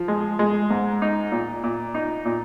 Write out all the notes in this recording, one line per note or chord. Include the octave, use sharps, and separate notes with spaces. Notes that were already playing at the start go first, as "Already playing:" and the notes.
Already playing: F3
G#3
G#3
G#2
D#4
A#2
A#2
D#4
A#2